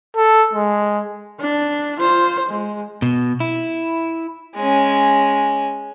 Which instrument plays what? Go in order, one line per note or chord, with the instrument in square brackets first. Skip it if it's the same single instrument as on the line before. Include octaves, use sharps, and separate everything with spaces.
[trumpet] A4
G#3
[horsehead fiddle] D4
F4 C5
G#3
[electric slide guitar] B2
E4
[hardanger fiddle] G#3 C#4